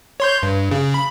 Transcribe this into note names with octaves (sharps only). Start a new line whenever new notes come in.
C#5 C6 G6
G2
C#3
B5